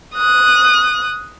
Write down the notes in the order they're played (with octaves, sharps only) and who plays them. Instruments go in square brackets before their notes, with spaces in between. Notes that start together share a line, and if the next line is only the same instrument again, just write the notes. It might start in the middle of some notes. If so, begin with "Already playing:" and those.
[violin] D#6 F#6